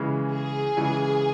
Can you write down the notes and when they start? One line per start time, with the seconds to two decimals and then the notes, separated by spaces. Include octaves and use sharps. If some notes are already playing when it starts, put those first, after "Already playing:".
Already playing: C#3 E3 G#3
0.31 G#4
0.77 C#3 E3 G#3